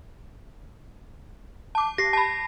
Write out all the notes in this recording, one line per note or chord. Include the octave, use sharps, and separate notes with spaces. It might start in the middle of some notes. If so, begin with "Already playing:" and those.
A5 D6
G4 A#6 C7
A5 B5